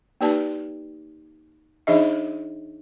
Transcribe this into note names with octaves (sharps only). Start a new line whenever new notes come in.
A#3 D#4 G4 B4 D5 A5
E3 D4 D#4 G#4 D#5 E5